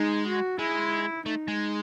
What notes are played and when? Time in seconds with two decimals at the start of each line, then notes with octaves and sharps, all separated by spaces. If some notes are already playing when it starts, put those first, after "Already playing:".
Already playing: G#3 D#4
0.26 F#4
0.59 G#3 E4
1.25 A3 D#4
1.48 G#3